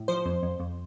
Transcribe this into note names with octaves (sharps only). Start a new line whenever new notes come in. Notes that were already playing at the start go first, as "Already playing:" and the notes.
Already playing: A2
F3 C5
F2
F2
F2